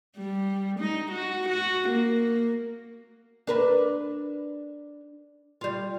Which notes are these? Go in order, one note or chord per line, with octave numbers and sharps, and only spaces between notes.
G3
D#4
F#4
F#4
A#3
D4 A#4 B4
G3 F4